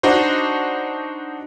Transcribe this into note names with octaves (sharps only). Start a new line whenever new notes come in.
D4 D#4 F#4 C5